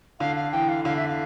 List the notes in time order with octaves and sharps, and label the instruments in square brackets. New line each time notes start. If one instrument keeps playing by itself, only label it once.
[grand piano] D3 [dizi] F5
[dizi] F5
[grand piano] E3 [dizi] G5
[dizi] F5
[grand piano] D3 [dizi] F5
[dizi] E5
F5